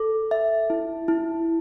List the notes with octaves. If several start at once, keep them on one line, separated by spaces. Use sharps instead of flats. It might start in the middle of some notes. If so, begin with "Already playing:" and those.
Already playing: A4
E5
E4
E4